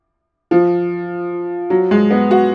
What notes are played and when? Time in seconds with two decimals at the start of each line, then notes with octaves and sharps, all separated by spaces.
0.51 F3
1.70 F#3
1.91 G#3
2.11 B3
2.31 F#4